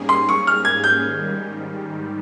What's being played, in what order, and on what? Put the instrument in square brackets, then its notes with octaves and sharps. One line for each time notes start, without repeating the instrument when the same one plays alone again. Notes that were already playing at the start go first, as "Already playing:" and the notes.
Already playing: [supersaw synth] G#2 G3 A#3 C#4 G#4
[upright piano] C6
C#6
F6
G#6
G6
[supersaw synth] G#2 D#3 G3